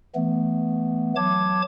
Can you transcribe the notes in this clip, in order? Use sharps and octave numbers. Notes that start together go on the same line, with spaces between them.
E3 A3 B3
F#3 A5 D6 G#6